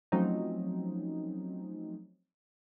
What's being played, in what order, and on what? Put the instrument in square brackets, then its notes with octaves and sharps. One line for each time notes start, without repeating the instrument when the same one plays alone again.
[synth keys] F3 F#3 A3 C4 C#4 D#4